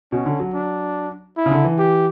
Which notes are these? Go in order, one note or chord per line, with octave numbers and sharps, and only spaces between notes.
B2 C#4
D3
F#3
D4
E4
C#3
D3
E3
G4